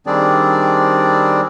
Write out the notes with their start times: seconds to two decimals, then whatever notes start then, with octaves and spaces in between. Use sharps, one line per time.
0.07 D#3 G3 C4 D4 G#4 D5